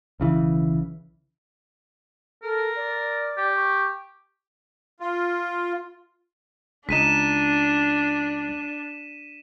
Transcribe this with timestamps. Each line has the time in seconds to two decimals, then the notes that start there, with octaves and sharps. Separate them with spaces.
0.20 B1 C#3 E3
2.43 A4 A#4
2.76 D5
3.37 G4
3.56 C#6
5.00 F4
6.89 C#2 D4 D#4 B6 D#7 E7